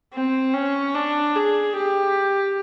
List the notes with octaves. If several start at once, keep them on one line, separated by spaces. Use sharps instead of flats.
C4
C#4
D4
G#4
G4